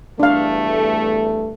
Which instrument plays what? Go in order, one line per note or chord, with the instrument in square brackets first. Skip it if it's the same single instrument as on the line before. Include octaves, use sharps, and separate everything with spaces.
[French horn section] E2 G2 A3 [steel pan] D4 F5